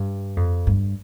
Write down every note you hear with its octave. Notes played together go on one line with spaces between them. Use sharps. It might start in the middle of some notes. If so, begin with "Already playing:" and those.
Already playing: G2
F2
G2